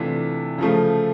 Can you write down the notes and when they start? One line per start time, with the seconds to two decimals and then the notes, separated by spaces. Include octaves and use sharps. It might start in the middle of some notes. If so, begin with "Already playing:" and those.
Already playing: C3 E3 A3 D4 F4
0.58 C#3 F3 A3